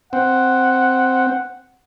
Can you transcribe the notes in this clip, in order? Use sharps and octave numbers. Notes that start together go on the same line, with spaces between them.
C4 F#5